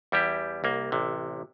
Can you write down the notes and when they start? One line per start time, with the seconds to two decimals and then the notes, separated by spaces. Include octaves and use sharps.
0.12 E2 G3 E4 G4
0.64 C2 A#3
0.92 A1 C3